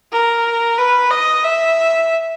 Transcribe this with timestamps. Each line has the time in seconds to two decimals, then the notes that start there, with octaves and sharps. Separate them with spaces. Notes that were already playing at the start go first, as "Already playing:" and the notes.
0.12 A#4
0.78 B4
1.11 D#5
1.44 E5